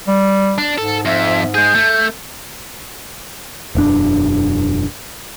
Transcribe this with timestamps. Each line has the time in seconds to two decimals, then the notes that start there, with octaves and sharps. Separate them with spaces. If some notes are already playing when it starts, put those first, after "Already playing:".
0.08 G3
0.58 D4
0.78 G#2 A4
1.05 F2 E5
1.55 G#3 G#4 G6
1.75 A3
3.75 E1 F#2 D4